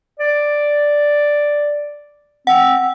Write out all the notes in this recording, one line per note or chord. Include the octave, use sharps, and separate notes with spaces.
D5
C4 F#5